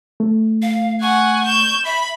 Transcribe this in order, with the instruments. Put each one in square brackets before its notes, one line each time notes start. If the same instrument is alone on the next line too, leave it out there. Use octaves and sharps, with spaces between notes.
[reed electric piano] A3
[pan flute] F5
[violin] F#5 G#5 [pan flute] C#6
[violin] G6 E7
[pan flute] E5 [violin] B5